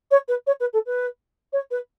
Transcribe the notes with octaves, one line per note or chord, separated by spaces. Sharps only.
C#5
B4
C#5
B4
A4
B4
C#5
B4